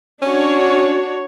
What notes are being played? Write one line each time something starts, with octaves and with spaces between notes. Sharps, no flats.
C#4 D4 F#4 C#5